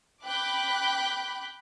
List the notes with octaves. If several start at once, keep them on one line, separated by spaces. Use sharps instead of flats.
G5 B5 D6 F#6